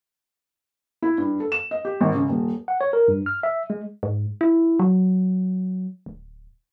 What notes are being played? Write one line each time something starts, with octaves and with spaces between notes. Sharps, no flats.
E4
G2
A4
E7
D#5
G4
G#1
C#3
D#1
F#5
C#5
A#4
G2
F6
E5
G#3
G#2
E4
F#3
D1